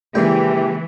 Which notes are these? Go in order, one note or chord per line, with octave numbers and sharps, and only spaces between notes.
C#2 A#2 E3 G4 G5